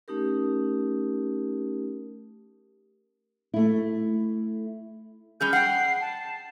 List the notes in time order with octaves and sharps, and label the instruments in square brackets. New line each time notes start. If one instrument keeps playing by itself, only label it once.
[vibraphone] A3 C#4 D#4 G4 A#4
[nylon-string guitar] A3 E4
[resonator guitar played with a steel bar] G3 C#4 G#4 [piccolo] G6
[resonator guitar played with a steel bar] F#5 G5 [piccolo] C7
[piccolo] A5